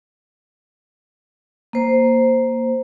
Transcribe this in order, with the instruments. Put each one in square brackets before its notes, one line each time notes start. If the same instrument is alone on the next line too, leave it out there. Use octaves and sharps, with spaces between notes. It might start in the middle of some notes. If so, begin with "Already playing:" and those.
[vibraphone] A#3 C5